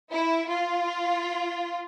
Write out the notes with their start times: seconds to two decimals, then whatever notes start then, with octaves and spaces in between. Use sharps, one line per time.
0.10 E4
0.48 F4